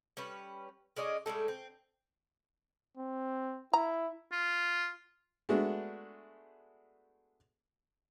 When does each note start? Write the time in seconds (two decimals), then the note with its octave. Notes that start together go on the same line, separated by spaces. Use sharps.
0.17 G3 C#4 B4
0.96 G#3 C#4 D5 D#5
1.26 A2 G3 G#3 A4
1.48 C4
2.98 C4
3.73 E4 A#5
4.32 F4
5.49 G#3 A3 B3 D4 F#4